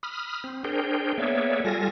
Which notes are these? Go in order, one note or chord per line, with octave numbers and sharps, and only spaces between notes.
B5 D#6 F6
C4
D4 G#4 A#4 C5 G5
A#3 B3 G#4 C#5 D5 E5
G3 F4 A4 G#5 A#6